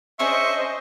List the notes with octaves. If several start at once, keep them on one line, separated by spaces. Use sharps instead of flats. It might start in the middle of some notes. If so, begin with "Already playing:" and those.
C#4 D4 G#4 C5 D#5 E5 C#6